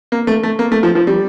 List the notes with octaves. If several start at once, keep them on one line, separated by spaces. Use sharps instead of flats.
A#3
A3
A3
A#3
A3
F3
F3
G3